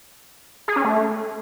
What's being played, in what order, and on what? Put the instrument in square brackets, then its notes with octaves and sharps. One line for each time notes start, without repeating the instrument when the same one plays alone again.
[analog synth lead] G#4
C#4
A3